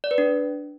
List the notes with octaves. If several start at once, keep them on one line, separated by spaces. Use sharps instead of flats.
D5
B4
D4